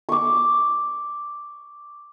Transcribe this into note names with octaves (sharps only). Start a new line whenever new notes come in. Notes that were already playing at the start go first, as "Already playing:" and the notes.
C#6 D6